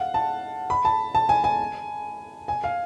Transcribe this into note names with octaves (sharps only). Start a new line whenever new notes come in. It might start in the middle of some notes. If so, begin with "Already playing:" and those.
Already playing: F5 F#5
A5
B5
A5
A5
G#5
G#5
G#5
F5